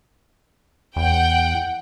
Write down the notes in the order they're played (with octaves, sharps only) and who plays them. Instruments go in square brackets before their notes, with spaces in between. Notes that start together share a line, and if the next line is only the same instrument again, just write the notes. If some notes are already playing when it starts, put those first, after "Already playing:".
[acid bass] E2 [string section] F#5 G5